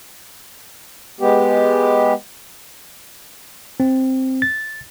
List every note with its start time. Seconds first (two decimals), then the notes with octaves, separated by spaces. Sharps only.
1.20 G#3 B3 G4
3.80 C4
4.42 A6